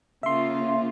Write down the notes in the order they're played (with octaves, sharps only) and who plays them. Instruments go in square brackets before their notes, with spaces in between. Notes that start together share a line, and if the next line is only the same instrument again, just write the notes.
[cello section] C#3 A#3 F4 [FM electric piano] E5 C6